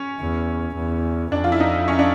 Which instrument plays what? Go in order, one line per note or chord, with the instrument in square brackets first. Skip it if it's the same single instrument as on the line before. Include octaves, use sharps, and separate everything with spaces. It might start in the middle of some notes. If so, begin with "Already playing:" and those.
Already playing: [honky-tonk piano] C#4
[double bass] E2
E2
[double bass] F2 [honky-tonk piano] D4
[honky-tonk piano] F4
E4
D#4
C#4
D4